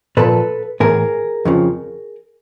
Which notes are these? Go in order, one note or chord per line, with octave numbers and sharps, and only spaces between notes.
A#2 F3 A4 B4
A2 E3 G#4 A#4
F2 C#3 F3